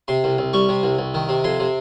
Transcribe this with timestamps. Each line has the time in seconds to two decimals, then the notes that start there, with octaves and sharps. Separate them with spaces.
0.08 C3 C6
0.24 C2
0.38 C2
0.53 G3 C#6
0.69 C3
0.83 C2
0.99 C2
1.14 D#3
1.29 C3
1.44 F2 C6
1.60 C3